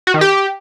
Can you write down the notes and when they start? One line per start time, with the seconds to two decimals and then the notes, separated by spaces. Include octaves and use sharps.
0.07 F#4
0.14 D#3
0.21 G4